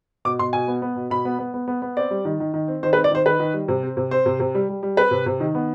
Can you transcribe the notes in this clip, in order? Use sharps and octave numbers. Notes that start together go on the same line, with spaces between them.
B2 D6
B2 C6
B2 G#5
B3
B3
B2
B2 B5
B3
B3
B3
B3
B3
C4 D5
G3
D#3
D#3
D#3
C4
D#3 C5
B4
C4
D5
D#3 C5
D#3 B4
D#3
G3
C3
C4
C3
C4 C5
C3
C3
G3
G3
G3
C4 B4
C3
C3
D#3
B3